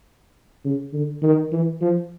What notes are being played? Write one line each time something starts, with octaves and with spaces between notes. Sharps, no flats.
C#3
D3
D#3
E3
F3